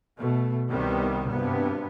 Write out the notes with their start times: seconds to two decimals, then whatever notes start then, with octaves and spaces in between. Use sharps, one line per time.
0.19 B2 A3
0.70 C2 C3 D#3 G3 B3
1.28 G#1 G2 C3 B3